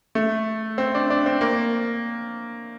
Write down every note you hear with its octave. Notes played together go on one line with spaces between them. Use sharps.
A3
C4
D4
D4
C4
A#3